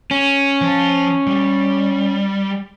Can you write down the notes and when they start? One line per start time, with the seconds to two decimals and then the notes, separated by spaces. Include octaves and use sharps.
0.11 C#4
0.61 F3 A5
1.27 G3